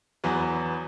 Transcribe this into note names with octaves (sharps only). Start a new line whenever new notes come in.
E2 E3 F#3 B3